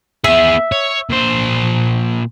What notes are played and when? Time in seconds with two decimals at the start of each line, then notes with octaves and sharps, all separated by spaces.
0.24 B3 G#4 E5
0.72 C#5
1.10 A#2 C5